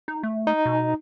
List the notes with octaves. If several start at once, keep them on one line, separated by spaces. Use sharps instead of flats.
D#4
A3
D#4
B2